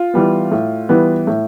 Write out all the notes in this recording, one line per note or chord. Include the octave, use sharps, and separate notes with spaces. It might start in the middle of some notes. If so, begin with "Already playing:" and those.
Already playing: F4
E3 G3 B3
A2
E3 G3 B3
A2